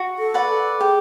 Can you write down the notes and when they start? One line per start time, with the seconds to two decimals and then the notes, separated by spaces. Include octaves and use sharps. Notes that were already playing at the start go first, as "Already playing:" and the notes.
Already playing: F#4
0.19 A4
0.34 B4 D5 F#5
0.49 A4
0.80 G4 G#4